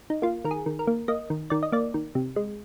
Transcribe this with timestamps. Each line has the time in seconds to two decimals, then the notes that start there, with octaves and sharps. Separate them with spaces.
0.10 D#4
0.22 A#3 F4
0.44 D#3 A#4
0.51 G#4
0.66 D#3
0.79 A#4
0.87 A#3
1.08 A#3 D#5
1.30 D#3
1.50 D#3 D5
1.63 D#5
1.72 A#3 D5
1.94 D#3
2.15 C3
2.36 G#3